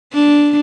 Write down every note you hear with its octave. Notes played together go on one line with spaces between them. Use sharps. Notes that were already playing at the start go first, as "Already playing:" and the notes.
D4